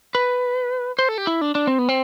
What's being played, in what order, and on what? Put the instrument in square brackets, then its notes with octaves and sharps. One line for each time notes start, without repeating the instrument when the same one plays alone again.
[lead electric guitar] B4
C5
A4
G4
E4
D4
D4
C4
B3
C4